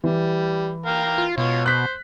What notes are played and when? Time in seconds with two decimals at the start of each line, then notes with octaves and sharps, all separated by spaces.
0.04 E3 G3
0.86 A#4 F5 G5
1.18 F4
1.38 B2 F4 C#5
1.66 C5 F#6 B6